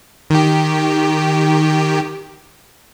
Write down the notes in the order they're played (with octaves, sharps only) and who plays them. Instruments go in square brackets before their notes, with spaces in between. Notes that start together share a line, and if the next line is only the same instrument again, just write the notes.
[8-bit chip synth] D#3 G4